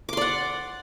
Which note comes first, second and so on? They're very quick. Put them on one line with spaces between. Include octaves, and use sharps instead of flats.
D6 C6 D5 F#5